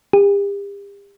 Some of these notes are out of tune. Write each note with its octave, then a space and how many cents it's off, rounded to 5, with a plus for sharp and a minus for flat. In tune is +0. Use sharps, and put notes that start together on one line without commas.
G4 +40